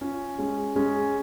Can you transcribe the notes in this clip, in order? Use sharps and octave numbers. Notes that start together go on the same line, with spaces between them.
C#4 F4
G#3 C#4
G#3 C#4